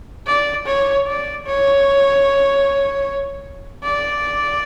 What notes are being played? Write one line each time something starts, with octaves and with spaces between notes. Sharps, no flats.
D5
C#5
D5
C#5
D5